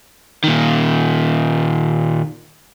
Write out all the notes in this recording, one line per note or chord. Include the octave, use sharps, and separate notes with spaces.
A#2 D#3